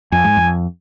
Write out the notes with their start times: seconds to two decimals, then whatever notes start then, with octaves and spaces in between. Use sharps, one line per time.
0.12 F2 G#5
0.24 G#2
0.37 F2